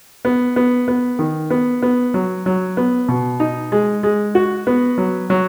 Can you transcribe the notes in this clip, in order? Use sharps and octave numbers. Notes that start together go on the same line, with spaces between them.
B3
B3
B3
D#3
B3
B3
F#3
F#3
B3
B2
D#4
G#3
G#3
F#4
B3
F#3
F#3